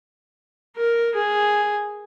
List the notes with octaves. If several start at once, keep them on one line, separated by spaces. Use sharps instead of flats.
A#4
G#4